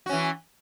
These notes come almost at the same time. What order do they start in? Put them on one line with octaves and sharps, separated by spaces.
F#4 C#4 E3